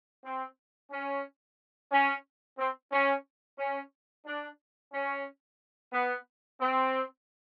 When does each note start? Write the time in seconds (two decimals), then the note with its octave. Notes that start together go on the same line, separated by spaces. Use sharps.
0.24 C4
0.91 C#4
1.92 C#4
2.59 C4
2.92 C#4
3.59 C#4
4.26 D4
4.93 C#4
5.93 B3
6.61 C4